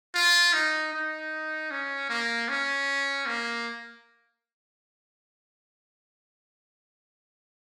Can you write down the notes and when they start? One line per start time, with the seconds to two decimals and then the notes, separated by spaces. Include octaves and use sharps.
0.15 F4
0.53 D#4
0.93 D#4
1.71 C#4
2.09 A#3
2.49 C#4
3.26 A#3